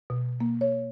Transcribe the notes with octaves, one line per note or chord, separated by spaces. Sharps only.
B2
A#3
C#5